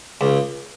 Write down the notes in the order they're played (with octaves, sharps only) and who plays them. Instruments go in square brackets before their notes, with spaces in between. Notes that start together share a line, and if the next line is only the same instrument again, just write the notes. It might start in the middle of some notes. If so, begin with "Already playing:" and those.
[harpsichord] C#2